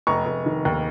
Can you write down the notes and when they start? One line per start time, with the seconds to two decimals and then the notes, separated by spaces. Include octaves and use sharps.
0.07 F1 A#5 C#6
0.26 F1
0.46 D#3
0.65 D#2